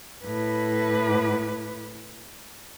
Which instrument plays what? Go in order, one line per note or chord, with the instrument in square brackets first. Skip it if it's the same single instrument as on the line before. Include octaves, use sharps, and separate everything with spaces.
[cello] A2 B4